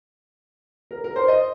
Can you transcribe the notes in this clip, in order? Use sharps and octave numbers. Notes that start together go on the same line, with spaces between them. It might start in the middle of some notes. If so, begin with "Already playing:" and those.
A#4
A#4
C5
D#5